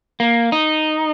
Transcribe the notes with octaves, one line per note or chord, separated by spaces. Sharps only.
A#3
D#4